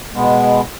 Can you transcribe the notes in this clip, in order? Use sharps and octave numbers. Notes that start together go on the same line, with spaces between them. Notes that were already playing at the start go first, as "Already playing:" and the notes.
B2 G#3 B3